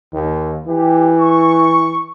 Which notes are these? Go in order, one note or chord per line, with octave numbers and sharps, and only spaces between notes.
D#2
E3 G4
C#6